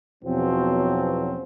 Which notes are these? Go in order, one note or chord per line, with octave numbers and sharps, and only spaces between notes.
E2 B2 F3 F#3 C4 C#4